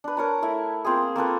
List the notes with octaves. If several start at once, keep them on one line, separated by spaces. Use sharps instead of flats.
D4 B4
A#4 C#5 A5 A#5
A3 E4 E5
A#3 C4 F4 G#4
A#3 C4 A4 B4